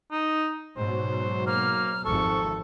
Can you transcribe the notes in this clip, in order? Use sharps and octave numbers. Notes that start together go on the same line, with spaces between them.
D#4
G#2 B2 F#3 C5
A#3 F6
G#1 F2 C3 A4 C#6